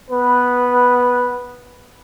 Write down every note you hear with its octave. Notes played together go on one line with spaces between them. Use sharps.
B3 B4